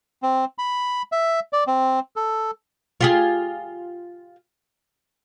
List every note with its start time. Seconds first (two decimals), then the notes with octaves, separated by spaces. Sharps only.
0.23 C4
0.58 B5
1.12 E5
1.53 D5
1.67 C4
2.16 A4
3.01 F4 G4 G#4